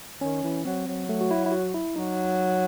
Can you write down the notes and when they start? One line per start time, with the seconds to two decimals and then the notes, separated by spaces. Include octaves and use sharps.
0.21 D#3 C#4
0.44 E3
0.65 F#3 C4
0.87 F#3
1.09 A3
1.21 F#4
1.31 E4
1.46 E4
1.52 F#4
1.74 E4
1.96 F#3 D#4